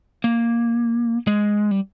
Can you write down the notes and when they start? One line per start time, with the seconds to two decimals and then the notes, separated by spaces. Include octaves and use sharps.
0.24 A#3
1.27 G#3
1.71 G3